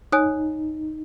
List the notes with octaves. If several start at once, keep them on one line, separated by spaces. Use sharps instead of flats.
D#4 C#5 G#5 D#6 F#6